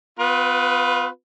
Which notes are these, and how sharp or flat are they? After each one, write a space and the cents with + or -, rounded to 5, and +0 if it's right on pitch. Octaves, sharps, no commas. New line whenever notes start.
B3 +40 F4 +25 B4 +0